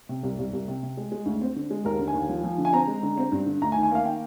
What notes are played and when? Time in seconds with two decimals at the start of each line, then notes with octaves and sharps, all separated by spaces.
0.09 C3
0.23 C2
0.39 C2
0.53 C2
0.68 C3
0.83 C3
0.97 G#3
1.12 G#3
1.26 D2
1.41 C4
1.56 D3
1.70 G#3
1.85 D#2 A#4
1.99 D3
2.08 G#5
2.14 D#2
2.29 F3
2.44 F3
2.58 D3
2.65 G#5
2.73 C4 A#5
2.88 G#3
3.03 D3
3.18 C4
3.32 G2
3.46 D3
3.62 D2 A#5
3.72 G#5
3.76 D#3
3.83 G#5
3.91 A#3 F5
4.05 D#3 G5